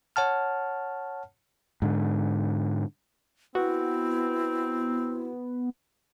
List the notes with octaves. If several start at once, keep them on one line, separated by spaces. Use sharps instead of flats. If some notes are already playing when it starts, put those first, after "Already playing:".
C#5 F#5 A5 F6
G#2 D3
B3 C4 E4 F#4